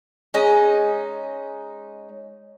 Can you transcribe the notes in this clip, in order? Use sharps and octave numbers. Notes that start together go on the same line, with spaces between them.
G#3 C#4 D#4 D#5